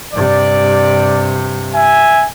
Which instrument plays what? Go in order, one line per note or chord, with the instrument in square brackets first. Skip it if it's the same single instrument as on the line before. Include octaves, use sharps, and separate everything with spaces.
[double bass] G2 C3 [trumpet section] D5
[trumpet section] E5 G#5